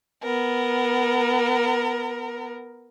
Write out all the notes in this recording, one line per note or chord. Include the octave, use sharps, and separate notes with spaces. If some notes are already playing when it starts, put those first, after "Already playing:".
B3 A#4